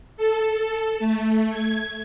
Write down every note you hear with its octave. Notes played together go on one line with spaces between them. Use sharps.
A4
A4
A3
G#6